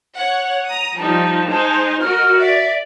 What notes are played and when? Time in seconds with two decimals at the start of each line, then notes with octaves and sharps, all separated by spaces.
0.17 C#5 F#5
0.68 A#5 D#6
0.97 F3 G3 D#4 A5
1.48 G#3 D#4 C5
2.01 F#4 A#4 D#5 F6
2.39 D5 E5